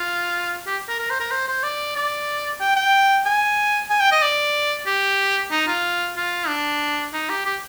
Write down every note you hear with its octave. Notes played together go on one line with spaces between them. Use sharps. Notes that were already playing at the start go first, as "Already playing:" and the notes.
Already playing: F4
G4
A#4
A#4
C5
A#4
C5
C5
D5
D5
G5
G5
G#5
G#5
G5
D#5
D5
G4
D#4
F4
F4
D4
D#4
G4
G4